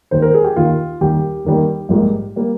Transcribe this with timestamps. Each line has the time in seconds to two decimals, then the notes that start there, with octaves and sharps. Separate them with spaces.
0.11 D#2 D#3 A#3 C5
0.22 A#4
0.34 G#4
0.44 G4
0.56 D#2 D#3 A#3 F4
1.01 D#2 D#3 G3 A#3 G4
1.44 D#2 D#3 G3 A#3
1.89 A#1 G#2 G3 A#3
2.36 G3 A#3